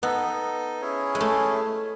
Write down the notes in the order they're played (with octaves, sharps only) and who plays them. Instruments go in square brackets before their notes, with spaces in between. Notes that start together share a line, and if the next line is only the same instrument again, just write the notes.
[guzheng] B3 [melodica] D#4 A4 D#5
[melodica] C#4 E4 G#4 C#5
[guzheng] G#3
A3